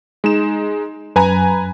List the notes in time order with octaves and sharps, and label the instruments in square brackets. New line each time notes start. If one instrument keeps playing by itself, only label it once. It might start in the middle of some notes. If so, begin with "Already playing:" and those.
[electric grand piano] G#3 D#4 E7
[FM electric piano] F#2 [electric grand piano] B4 G#5 A#5